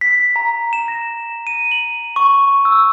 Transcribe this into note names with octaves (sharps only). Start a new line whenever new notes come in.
B6
A#5
E7
A#6
D#7
F#7
C#6
E6